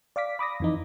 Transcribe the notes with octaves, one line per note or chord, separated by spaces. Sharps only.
D5 F5 D6 B6
B5 D6 D#6 A#6
F2 E3 D#4